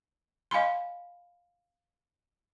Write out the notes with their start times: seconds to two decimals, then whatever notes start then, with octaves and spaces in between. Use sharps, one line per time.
0.51 D#5 F5 G#5 B5 C6